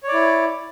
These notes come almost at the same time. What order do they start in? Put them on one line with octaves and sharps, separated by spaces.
C#5 D5 E4